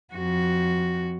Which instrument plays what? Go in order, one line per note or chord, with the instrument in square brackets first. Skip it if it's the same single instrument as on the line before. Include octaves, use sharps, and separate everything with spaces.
[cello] F2 F#4